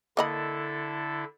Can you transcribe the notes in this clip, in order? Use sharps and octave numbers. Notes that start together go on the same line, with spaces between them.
D3 A#3 E4 A4 D#5 B5